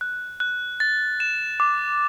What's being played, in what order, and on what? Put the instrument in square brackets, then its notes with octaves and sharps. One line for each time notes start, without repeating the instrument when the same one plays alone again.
[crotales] F#6
F#6
A6
E7
D6